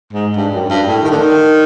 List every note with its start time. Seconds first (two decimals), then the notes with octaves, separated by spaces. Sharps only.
0.13 G#2
0.36 G2
0.53 F#2
0.70 G2
0.87 A2
1.04 D#3
1.11 D3
1.19 D#3